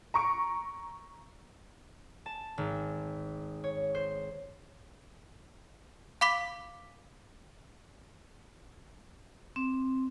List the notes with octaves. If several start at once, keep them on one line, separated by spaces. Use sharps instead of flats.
A#5 C#6 D7
A5
G#1
C#5
C5
F5 B5 D6 B6
C4